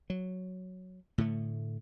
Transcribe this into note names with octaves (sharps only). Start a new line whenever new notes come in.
F#3
A2 D3 A3